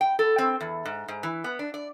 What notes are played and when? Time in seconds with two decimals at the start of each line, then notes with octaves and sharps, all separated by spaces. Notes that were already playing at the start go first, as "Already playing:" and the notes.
0.01 G5
0.19 A4
0.38 C4
0.61 E2
0.85 G#2
1.08 G#2
1.23 E3
1.44 B3
1.59 D4
1.74 D5